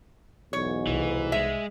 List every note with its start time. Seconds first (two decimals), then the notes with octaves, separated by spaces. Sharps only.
0.53 B1 E2 G#2 C#5
0.87 C2 E3
1.32 G#3 E5